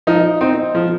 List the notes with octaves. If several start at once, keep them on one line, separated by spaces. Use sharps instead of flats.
F3 D#4
C4 D#4
F3